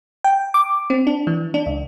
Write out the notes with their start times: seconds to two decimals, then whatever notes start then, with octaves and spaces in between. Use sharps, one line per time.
0.24 G5
0.54 D6
0.90 C4
1.07 D4
1.27 E3
1.54 D4
1.66 C#2